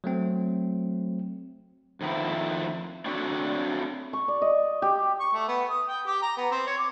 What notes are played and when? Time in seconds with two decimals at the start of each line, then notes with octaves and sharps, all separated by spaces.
0.04 F#3 A3 C4
2.01 F2 D#3 F3 B3 E4
3.06 C4 D4 F#4 A4 C#5 D5
4.13 C#6
4.28 D5
4.42 D#5
4.82 G4
5.20 C#6
5.34 A3
5.48 B3
5.70 D#6
5.88 G5
6.07 G4
6.22 A#5
6.37 B3
6.52 C4
6.67 C#5
6.78 D6